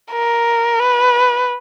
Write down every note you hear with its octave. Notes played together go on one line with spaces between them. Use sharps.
A#4
B4